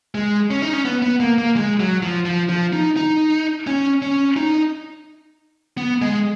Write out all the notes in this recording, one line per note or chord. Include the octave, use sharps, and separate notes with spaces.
G#3
C#4
D#4
C#4
B3
B3
A#3
A#3
G#3
F#3
F3
F3
F3
D#4
D#4
C#4
C#4
D#4
B3
G#3